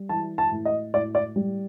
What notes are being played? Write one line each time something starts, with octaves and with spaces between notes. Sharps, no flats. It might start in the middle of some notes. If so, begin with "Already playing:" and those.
Already playing: G3
E3 A5
A5
A2
D#5
A2 D5
D5
G3